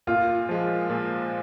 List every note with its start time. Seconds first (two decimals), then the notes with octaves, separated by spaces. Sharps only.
0.07 A#2 F4
0.49 F3 G#3
0.90 A#2